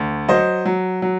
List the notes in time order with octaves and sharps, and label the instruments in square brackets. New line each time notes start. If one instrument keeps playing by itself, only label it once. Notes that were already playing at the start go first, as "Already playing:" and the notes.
Already playing: [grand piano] D2
F#3 C5 D#5
F#3
F#3